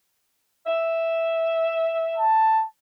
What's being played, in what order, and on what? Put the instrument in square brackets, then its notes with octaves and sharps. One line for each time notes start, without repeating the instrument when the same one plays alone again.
[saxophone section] E5
[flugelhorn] A5